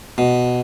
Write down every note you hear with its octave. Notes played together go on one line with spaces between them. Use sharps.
B2